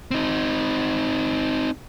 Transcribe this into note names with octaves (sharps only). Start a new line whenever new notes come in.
C4 D#4